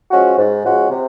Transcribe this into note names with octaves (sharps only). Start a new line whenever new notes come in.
F3 G#3 C#4 F#4
G#2
F3 G#3 C#4 F#4
C3